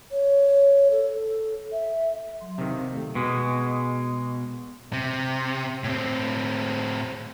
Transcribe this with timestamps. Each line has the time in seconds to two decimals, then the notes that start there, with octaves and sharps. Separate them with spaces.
0.12 C#5
0.91 A4
1.72 E5
2.41 F#3 C6
2.58 C3 D#3 C4 F5
2.91 A3 A4
3.15 B2 G#3
4.93 C3
5.84 A2 C4